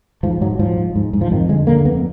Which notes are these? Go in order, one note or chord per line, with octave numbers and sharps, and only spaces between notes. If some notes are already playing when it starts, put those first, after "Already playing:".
G#2 F3
G#2 F#3
G#2 F3
G#2
G#2
G#2
F3
F2 D#3
D3 G#3
D3 A#3
F2 B3